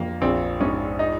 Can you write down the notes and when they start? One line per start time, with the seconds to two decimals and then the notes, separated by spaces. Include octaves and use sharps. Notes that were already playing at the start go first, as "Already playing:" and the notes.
Already playing: F2 A#3
0.21 A#1 C4
0.60 G#2 C#4
0.99 D#4